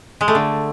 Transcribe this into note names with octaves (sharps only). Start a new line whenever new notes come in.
G#3
A3
D3